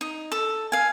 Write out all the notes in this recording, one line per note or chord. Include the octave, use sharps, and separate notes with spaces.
D#4
A4
F5 G#5